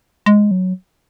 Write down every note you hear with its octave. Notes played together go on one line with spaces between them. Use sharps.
G#3
F#3